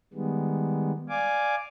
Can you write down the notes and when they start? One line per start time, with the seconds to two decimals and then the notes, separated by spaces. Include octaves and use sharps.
0.14 D#3 G3 G#3 B3
1.09 D5 F5 G#5 D6